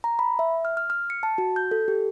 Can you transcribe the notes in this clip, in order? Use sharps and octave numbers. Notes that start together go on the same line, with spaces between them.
A#5
B5
E5
F6
F6
F6
C#7
A5
F#4
G6
A4
G4